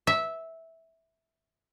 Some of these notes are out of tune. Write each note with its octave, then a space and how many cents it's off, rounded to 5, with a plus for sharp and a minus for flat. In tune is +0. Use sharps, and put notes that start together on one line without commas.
E5 -10